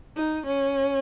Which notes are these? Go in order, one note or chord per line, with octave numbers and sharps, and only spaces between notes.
D#4
C#4